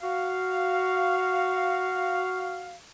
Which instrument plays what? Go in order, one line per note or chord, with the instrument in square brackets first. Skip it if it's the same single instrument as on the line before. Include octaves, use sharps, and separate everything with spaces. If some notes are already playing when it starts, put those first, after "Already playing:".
[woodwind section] F#4 F5